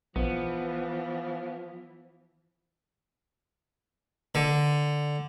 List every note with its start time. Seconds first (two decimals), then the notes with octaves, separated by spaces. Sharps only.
0.16 A#1 E3 F3 B3
4.35 D3